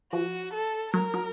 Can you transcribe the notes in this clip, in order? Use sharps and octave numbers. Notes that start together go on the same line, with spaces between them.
F3 F#4
A4
F#3 A#4
F#3